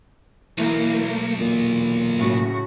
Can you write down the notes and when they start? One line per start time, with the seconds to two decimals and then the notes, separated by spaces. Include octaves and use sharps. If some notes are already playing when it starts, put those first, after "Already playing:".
0.58 B1 E3 A#3
1.39 E2 A#2
2.17 A2 C#3 F#4